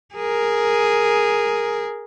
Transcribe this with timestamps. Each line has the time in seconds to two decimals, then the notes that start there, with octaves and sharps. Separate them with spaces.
0.14 G#4 A#4